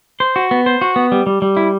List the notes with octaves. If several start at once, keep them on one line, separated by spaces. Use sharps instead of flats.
C5
F#4
B3
C5
F#4
B3
G3
G3
G3
E4